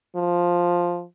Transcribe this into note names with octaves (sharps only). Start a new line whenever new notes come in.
F3